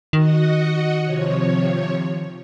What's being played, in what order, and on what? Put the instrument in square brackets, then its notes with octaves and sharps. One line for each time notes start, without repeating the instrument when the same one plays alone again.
[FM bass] D#3 [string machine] F#4 D#5 F#5
[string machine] C3 F3 C#5